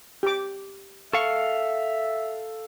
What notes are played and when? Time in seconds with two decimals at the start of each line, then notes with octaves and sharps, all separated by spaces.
0.23 G4 D6
1.13 A4 E5 F5 C#6